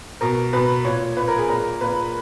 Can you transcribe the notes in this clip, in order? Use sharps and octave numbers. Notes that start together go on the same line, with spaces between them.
B2 A#4
B2 B4
A#2 C#5
A#2 B4
A#4
G#4
A#2 A#4
A#2 B4